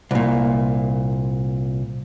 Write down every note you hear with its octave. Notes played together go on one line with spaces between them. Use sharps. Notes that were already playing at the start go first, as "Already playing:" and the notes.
C2 A#2